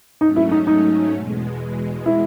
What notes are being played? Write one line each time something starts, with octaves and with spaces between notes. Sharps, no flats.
G#2 F#3 A3 C#4 D#4
E4
D#4
D#4
E2 B2 G#3
E4